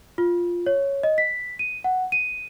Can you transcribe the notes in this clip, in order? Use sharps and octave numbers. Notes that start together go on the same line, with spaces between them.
F4
C#5
D#5
B6
D#7
F#5
D#7